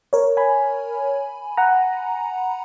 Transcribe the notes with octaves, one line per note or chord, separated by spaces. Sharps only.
A#4 C#5
G#5 B5
F#5 A#5